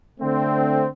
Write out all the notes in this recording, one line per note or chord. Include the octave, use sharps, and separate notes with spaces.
D3 A3 C4